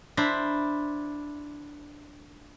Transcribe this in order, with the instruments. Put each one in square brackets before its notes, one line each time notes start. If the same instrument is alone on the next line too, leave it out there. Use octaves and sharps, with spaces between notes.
[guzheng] D4 E4 C5 A#5 B5